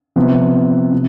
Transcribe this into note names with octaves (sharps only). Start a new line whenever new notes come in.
C3 F3 B3
C3